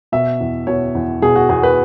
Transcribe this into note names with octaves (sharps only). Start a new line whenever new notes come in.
B2 E5
E2
B2 C#5
E2
B2 G#4
F#4
E2 G#4
B4